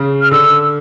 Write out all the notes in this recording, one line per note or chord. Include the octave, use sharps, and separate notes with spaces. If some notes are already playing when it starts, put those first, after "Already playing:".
Already playing: C#3
F6
D3 E6